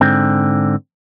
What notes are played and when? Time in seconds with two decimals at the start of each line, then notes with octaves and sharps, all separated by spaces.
0.01 G#2 D3 C4